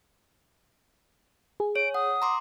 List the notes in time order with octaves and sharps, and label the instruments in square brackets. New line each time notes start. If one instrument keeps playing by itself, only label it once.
[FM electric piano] G#4
[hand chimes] C#5 [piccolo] D7
[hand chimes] F#5 [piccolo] D#6
[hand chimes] A#5 C6 D6